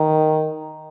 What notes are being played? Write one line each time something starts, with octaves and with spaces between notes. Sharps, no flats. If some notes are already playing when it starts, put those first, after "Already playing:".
Already playing: D#3